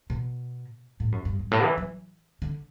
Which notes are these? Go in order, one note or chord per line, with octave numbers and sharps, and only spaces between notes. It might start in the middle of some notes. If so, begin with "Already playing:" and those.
B2
A2
F#2
G2
G2
A2
E3
F#3
D3